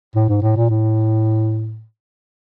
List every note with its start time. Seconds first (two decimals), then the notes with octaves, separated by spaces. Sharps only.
0.16 A2
0.29 G#2
0.42 A2
0.56 A#2
0.70 A2